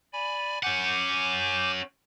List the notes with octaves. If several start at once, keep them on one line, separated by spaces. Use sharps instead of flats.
D5 G#5 B5
C#4 F#5 G#5 D6 G6